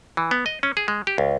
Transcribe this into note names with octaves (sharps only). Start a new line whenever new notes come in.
E3
B3
D#5
C#4
G#4
G#3
G4
C#2